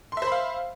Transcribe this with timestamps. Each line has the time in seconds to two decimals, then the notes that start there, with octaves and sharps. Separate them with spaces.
0.12 C6
0.17 E5
0.22 C5
0.27 B5
0.32 F5